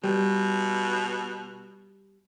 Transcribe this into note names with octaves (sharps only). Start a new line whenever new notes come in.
B2 G3